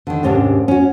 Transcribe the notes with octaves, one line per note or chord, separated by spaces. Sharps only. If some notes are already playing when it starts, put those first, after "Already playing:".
D3 D#3
D#2 G#2 C3 C#4 D4
C#4 F#4